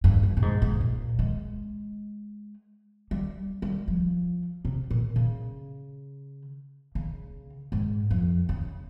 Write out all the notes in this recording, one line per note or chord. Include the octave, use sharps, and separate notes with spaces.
G2
G2
A#2
G#2
G#2
A#2
G#3
G3
G3
F3
C3
A#2
C#3
C#3
G#2
F2
C#3